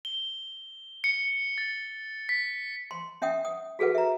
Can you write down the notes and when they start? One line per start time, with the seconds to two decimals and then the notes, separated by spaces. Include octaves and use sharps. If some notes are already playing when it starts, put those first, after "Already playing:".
0.05 G7
1.04 C#7
1.58 A6
2.29 B6
2.91 C6
3.22 C#4 E5 F#5 G5 D#6
3.45 D#6
3.79 F#4 G#4 A4 B4 F#5
3.95 E5 A#5